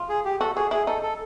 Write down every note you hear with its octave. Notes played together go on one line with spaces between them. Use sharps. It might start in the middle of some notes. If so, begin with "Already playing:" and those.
Already playing: F4
G#4
G4
F#4 A4
F#4 G#4
E4 G#4
D#4 A4
A4